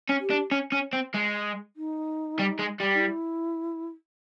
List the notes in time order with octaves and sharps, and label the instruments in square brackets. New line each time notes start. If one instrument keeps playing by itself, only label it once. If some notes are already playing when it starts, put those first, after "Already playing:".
[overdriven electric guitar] C#4
[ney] G4
[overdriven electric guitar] D4
C#4
C#4
C4
G#3
[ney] D#4
[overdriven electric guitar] G3
G#3
G3
[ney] D#4
E4